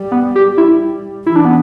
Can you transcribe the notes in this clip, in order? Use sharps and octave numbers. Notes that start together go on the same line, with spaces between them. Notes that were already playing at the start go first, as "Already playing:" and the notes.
Already playing: G3
B3
G4
E4
E3 E4
D4
B3